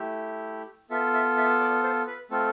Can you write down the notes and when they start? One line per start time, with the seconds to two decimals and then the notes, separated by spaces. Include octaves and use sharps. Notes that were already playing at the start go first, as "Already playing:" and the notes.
Already playing: A3 E4 G4
0.90 B3 F4 A4 E5
1.14 E5
1.37 E5
1.60 D5
1.83 C5
2.07 B4
2.30 A3 C4 F4 A4